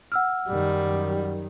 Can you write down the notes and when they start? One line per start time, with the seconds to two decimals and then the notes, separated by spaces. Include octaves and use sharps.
0.12 F#5 E6 F6
0.48 F#2 D#3 G3